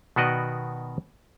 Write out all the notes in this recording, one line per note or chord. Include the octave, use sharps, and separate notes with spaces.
B2 D#3 B3 F#4 D5 D#5